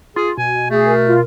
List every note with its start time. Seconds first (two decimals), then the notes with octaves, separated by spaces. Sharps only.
0.16 F4 G#4
0.37 B2 G#5
0.70 A3 G#4
0.85 A#4
1.06 F4